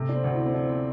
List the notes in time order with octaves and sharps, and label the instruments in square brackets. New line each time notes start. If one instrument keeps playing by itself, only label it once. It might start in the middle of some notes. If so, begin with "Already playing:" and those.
Already playing: [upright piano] C3 [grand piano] A3
[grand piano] D4
C4
[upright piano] D2
[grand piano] E4
C4
[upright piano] F3 [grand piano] D4
[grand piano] C4